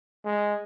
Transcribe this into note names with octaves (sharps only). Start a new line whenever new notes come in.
G#3